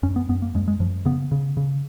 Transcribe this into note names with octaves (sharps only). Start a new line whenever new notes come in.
F#2 C#4
B3
F#2 B3
A#3
F#2 G#3
G#3
F#2 F3
C#3 B3
C#3
C#3